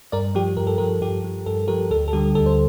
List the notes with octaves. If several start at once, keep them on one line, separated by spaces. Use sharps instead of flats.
G2 A#4 D5
F3 G4
G2 A#4
A4
F3 G4 A#4
G2 G4
F3
G2 A4
F3 G4 A#4
D2 A4
A4
D3 G3 G4
D2 A4
C5